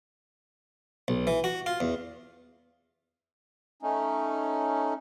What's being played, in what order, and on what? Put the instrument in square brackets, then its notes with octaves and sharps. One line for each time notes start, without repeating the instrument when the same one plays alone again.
[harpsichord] B1
E3
F#4
F4
E2
[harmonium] A3 C#4 D#4